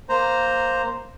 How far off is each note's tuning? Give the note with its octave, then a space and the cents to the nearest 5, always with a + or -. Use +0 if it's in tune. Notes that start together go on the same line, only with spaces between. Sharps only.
A#3 +0 C5 +0 A#5 -5